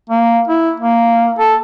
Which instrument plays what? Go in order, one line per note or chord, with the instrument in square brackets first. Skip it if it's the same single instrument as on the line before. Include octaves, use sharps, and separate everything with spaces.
[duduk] A#3
E4
A#3
A4